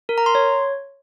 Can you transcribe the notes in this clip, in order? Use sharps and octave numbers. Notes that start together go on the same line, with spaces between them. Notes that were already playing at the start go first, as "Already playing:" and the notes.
A#4
A#5
C6
C#5